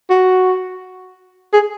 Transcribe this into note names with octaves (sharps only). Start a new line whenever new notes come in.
F#4
G#4